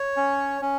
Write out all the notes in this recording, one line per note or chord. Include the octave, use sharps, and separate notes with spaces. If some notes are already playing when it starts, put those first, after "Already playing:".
Already playing: C#5
C#4
C#4